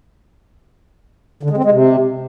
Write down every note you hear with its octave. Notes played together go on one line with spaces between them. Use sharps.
D3
G#3
C4
G#3
C3